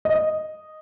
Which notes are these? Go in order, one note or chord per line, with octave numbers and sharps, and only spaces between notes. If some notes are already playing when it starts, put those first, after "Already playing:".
D#5